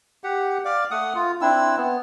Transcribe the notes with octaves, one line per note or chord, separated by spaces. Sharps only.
G4 F#5
D5 F5
A3 F#5 D#6
F4
C4 D4 E4 E6
B3